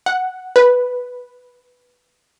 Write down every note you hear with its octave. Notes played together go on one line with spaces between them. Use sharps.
F#5
B4